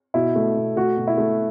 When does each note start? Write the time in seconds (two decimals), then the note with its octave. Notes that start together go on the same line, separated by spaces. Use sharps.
0.14 B2 E4
0.35 A3
0.56 B2
0.76 A3 F#4
0.97 B2
1.07 E4
1.18 A3